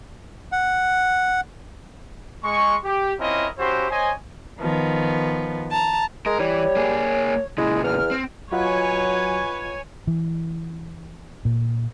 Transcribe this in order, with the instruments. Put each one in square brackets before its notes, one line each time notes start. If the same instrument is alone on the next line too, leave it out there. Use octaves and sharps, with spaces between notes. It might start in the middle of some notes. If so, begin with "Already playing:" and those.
[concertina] F#5
[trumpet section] G#3 C#6
G4
C4 C#4 E4 F4 A#4 D#5
C#4 E4 F#4 G4 C5
C5 C#5 D#5 G#5
[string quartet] D#3 F3 B3
A5 A#5
[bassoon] G#3 [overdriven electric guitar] A#4
[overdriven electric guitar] E3 [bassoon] G3 [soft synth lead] C#5
[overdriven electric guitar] A#3 G#4
[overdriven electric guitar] A#2 C#3 [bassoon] G#3 [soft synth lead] E4
[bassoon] E2 [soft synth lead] F6
[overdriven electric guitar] C4
[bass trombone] F#3 [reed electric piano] F4 D#5 F#5 [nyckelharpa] B4 [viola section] C#5 G#5
[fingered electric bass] E3
A#2